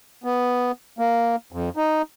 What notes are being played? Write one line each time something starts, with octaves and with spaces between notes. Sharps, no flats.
B3
A#3
F2
D#4